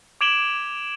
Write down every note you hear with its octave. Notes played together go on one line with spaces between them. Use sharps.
D6 G#6 D7 E7 F#7 G7